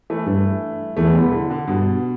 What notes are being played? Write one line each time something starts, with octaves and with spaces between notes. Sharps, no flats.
E3 A3
G2 E3 A3
E2 E3 A3
D3 G3
D3
D3
G2 B2